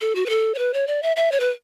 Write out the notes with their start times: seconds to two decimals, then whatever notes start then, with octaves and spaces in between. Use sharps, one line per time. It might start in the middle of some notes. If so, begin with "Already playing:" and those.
0.01 A4
0.15 F#4
0.26 B4
0.29 A4
0.55 C#5
0.58 B4
0.74 C#5
0.87 D5
1.03 E5
1.16 E5
1.32 C#5
1.40 B4